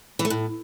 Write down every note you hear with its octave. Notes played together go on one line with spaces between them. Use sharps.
E3
A3
A2